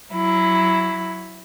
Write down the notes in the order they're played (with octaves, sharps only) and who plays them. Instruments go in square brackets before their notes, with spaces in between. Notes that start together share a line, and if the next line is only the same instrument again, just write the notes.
[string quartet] F#3 E4